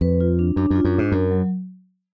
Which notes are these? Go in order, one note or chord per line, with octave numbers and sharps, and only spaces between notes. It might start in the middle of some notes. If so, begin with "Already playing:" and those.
F2 B4
F4
D4
F#2 D4
F#2 F4
F#2
G#2 D4
F#2 A#4
F#3